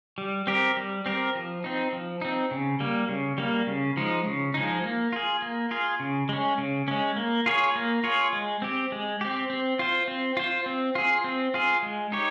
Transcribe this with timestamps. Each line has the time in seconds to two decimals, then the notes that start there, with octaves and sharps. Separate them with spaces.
0.18 G3
0.47 C4 G4 A#4
0.77 G3
1.06 C4 G4 A#4
1.35 F3
1.64 C4 D#4
1.93 F3
2.22 C4 D#4
2.51 C#3
2.80 G3 A#3
3.09 C#3
3.38 G3 A#3
3.67 C#3
3.97 F3 G#3 D#4
4.26 C#3
4.54 F3 G#3 D#4
4.84 A#3
5.13 F4 G#4
5.42 A#3
5.71 F4 G#4
6.00 C#3
6.29 G#3 C#4
6.58 C#3
6.88 G#3 C#4
7.16 A#3
7.46 F4 G#4 C#5
7.76 A#3
8.04 F4 G#4 C#5
8.33 G#3
8.62 C4 G4
8.92 G#3
9.21 C4 G4
9.50 C4
9.79 F4 C5
10.08 C4
10.37 F4 C5
10.66 C4
10.95 F4 G#4
11.24 C4
11.54 F4 G#4
11.83 G#3
12.12 D#4 G4 C#5